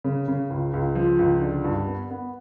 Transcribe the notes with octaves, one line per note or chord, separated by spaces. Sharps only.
C#3
C#3
C#2
C#2
F3
C#2
D3
G2
B3
B3